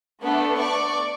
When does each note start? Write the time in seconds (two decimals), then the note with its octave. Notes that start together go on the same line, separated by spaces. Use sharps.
0.22 A3 B3 D4 A4
0.58 D5 C#6